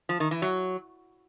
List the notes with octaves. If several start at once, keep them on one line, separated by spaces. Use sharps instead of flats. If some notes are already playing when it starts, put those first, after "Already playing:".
F3
D#3
E3
F#3